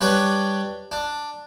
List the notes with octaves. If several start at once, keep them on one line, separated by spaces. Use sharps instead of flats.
G3 D4 B4 C#5
D4